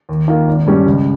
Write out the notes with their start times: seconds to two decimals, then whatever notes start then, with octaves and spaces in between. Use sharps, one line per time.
0.09 D#2
0.28 D#3 A#3 F4
0.47 G#1
0.66 G2 G3 C#4 G4
0.86 C#2